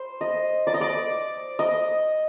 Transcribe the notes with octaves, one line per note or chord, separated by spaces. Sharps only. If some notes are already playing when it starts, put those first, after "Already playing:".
Already playing: C5
D#5
D5
D#5
D5
D#5